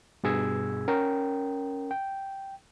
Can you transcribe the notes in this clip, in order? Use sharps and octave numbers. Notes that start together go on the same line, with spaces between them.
G2 B2 G#4 E6 G#6
C#4 A#4 G5
G5